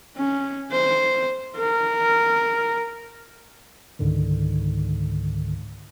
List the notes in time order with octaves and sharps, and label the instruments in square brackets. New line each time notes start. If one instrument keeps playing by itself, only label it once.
[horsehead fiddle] C#4
C5
A#4
[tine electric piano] C#2 G#2 D3 D#3